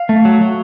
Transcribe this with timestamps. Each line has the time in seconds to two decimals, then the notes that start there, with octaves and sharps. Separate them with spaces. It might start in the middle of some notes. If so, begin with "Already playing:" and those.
Already playing: F5
0.09 A3
0.25 F#3
0.41 F#3